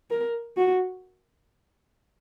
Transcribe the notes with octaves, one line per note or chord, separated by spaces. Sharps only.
A#4
F#4